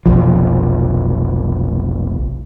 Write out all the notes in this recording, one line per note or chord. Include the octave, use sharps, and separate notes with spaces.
F1 B1 F3